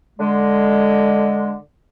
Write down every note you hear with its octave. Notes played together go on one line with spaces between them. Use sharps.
D3 G#3